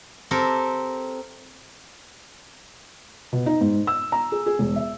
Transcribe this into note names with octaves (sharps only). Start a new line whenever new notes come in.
C4 G4 A4 A#4
B2
D#4
G#2
E6
A#5
G#4
G#4
E1
E5